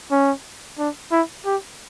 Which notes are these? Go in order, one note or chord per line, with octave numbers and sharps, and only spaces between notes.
C#4
D4
E4
G4